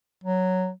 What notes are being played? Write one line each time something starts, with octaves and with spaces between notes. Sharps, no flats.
F#3